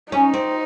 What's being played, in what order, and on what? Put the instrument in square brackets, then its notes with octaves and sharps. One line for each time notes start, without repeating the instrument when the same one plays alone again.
[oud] C#4 [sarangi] D#4
[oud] C4